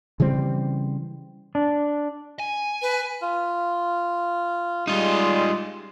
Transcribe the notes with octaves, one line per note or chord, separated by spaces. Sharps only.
C#3 E3 G3 C4
D4
G#5
B4
F4
G3 G#3 D#4 F4